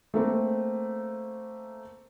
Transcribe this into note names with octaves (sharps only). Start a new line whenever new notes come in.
A3 A#3 C4